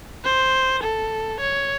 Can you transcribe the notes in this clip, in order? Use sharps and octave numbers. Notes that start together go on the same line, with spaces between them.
C5
A4
C#5